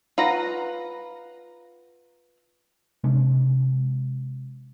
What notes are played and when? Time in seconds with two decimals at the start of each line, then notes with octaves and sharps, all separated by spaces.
0.18 F4 B4 F#5 A#5
3.04 C3 G#3 C#4 D4